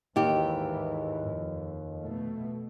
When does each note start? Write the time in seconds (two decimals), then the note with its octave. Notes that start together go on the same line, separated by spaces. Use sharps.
0.16 D#2 G#2 E3 G4
1.28 F2
2.02 B2 A3